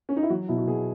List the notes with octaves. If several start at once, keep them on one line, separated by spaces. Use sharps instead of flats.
C#4
D#4
E4
F#3 F#4
B2 E4
F#4
B2 G#4